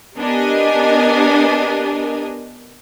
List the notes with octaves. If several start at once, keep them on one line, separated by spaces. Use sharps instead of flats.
B3 D4 G4 A#4 D#5 G#5